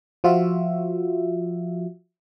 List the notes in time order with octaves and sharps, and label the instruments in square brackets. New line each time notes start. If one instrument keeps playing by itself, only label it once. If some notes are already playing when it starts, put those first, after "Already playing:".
[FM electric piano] F3 F4 F#4 E5